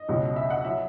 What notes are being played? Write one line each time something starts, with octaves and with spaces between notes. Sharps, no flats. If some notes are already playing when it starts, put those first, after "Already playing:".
Already playing: D#5
C#2 B2 F#3
E5
F#5
F#3 E5